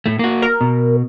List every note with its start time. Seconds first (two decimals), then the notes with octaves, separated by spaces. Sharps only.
0.06 A2 A3
0.19 A#3 F#4
0.42 A#4
0.61 B2